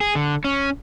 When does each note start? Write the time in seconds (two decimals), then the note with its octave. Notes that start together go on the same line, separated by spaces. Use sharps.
0.01 G#4
0.15 D3
0.44 C#4